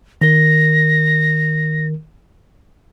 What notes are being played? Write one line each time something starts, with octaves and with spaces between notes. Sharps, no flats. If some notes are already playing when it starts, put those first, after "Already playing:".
D#3 A#4 A#6